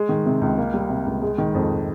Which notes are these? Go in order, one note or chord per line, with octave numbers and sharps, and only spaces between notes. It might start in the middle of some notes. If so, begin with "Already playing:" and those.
Already playing: G#3
D#3
C3
C#2
A#3
G3
C3
C#2
G#3
D#3
F2